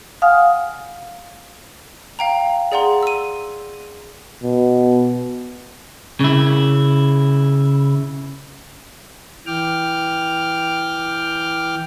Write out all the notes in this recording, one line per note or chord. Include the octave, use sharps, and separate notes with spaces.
F5 F#5 G#5 D#6 F6
F5 G5 A#5
G#4 D5 F#5 A#5 C6
E6 D#7
B2
C#3 E4
E3 G5 D6 F6